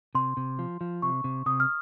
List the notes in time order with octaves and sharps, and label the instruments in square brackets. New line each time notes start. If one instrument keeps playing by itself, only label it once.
[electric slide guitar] C3 [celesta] C6
[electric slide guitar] C3
F3
F3
[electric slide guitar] C3 [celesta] C#6
[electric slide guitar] C3
[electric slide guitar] C3 [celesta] D#6
[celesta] F6